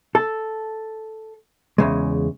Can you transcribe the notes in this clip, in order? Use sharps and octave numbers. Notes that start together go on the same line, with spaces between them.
A4
E2 C#3 G#3